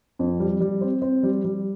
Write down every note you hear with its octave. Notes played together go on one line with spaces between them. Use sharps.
F2
G3
G3
C4
C4
G3
G3